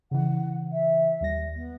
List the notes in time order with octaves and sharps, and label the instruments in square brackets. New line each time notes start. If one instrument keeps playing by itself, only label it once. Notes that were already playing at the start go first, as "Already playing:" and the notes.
[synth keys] C#3 E3 [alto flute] F#5
[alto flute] E5
[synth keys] D#2 G3 A#6
[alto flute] B3